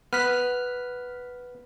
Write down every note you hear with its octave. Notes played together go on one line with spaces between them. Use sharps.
B3 F6 F#6 B6